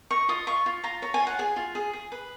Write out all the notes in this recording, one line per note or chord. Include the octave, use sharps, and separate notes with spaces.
D#5 C#6
F4 D#6
F4 C#6
F4
F4 A#5
C#5 A#5
G#5
F4
F#5
G#4 G#5
F4
G#4
G#4
B4